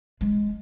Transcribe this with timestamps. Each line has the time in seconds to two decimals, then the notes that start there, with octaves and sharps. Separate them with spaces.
0.21 G#3